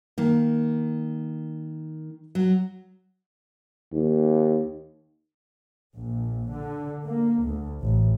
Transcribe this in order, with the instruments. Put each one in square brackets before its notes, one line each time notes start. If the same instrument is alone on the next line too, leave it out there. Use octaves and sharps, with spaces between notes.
[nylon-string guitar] D#3 A#3
F#3
[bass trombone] D#2
[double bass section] A#1
D3
A#3
D2
A1